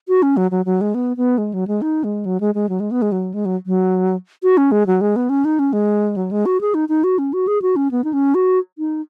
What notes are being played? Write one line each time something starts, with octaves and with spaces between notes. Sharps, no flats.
F#4
C#4
F#3
F#3
F#3
G#3
B3
B3
G#3
F#3
G#3
D#4
G#3
F#3
G#3
G#3
F#3
G#3
B3
G#3
F#3
G#3
F#3
F#3
F#4
C#4
G#3
F#3
G#3
B3
C#4
D#4
C#4
G#3
F#3
G#3
F#4
G#4
D#4
D#4
F#4
C#4
F#4
G#4
F#4
C#4
B3
D#4
C#4
F#4
D#4